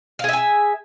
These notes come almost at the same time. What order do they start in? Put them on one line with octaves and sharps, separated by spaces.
F5 G#4 E5 G#5